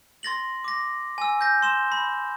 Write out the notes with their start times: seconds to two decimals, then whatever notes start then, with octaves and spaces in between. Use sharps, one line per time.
0.23 C6 A6 A#6 F#7
0.64 D6 A#6
1.18 G#5 E6
1.41 G6 A#6
1.63 C6 E7 G7
1.92 B5